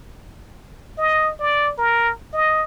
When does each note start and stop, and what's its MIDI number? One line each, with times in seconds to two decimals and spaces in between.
0.98 1.31 75
1.40 1.72 74
1.78 2.11 70
2.33 2.64 75